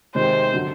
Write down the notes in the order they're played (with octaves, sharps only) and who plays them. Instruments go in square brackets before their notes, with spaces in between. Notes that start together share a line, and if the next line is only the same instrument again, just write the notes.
[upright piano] C3 D#3 G#3 [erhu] C5
[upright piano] D3 F#3